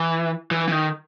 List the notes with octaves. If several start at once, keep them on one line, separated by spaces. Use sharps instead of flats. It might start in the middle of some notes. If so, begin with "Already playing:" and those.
Already playing: E3
E3
E3
D#3